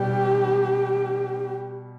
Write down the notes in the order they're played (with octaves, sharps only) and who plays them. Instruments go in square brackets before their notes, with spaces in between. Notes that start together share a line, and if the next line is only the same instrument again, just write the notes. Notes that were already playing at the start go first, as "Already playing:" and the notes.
Already playing: [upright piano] B2 G3 [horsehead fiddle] G4